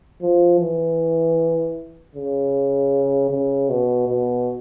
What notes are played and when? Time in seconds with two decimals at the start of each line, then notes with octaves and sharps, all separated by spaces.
0.22 F3
0.60 E3
2.15 C#3
3.31 C#3
3.70 B2
4.08 B2